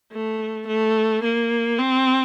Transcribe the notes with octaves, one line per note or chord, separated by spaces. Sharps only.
A3
A3
A#3
C4